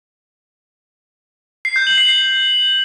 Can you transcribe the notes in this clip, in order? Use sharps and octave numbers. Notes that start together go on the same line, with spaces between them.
C7
G6
F#7
C7
C7